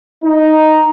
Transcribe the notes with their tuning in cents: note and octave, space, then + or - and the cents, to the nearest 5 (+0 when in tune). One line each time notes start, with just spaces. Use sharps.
D#4 +0